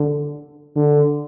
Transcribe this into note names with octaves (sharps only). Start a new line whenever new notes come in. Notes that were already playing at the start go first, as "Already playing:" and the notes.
Already playing: D3
D3